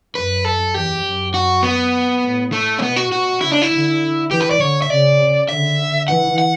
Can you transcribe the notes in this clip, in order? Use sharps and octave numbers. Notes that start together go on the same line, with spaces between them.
F#2 B4
A4
E2 G4
F#2
F#4
B3
A2
A3
C#4
B2 B3
F#4
B2 F#4
C#3 E4
D4
E4
D3
E3 G4
B4
D5
D3 C#5
E5
C#3 D5
D3 E5
E3 F#5
F#5